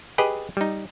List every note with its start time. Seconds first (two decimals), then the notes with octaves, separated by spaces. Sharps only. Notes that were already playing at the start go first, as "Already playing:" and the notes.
0.18 G4 G#4 B4 D#5
0.57 G3 D#4